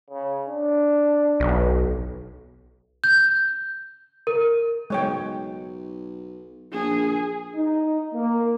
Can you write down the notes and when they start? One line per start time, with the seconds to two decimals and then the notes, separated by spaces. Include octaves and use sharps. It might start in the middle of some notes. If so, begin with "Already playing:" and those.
0.10 C#3
0.48 D4
1.40 B1
3.04 G6
4.27 A#4
4.90 B1 G#3 C#5 G5
6.73 A#1 G#4
7.56 D#4
8.14 A#3